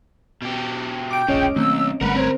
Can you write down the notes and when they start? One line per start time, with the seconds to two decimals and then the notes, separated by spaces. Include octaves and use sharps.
0.42 B2 G4
1.11 G5 D6 D7
1.28 E1 A#1 C#3 G#3 C#4 C#5 D#5
1.56 B1 D#3 A3 A#3 C4 E6
2.01 G#1 D3 G3 A3 A#4 B4 F#5 B5
2.16 C4 C5 C#5